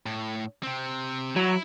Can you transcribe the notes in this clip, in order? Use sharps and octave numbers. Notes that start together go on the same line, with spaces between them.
A2
C3 C4
F#3 E4